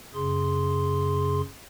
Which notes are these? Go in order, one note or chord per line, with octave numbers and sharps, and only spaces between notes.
F#2 C#3 G#4 C6